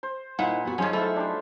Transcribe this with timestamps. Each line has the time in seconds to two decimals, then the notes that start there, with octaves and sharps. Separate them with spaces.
0.03 C5
0.39 A#2 D#4 E4 B4 C5 F#5
0.65 B3 F#4
0.78 F#2 F3 F#3 C#4 D#4 G#4 C5
0.93 A3 E4 F4
1.16 D4 G4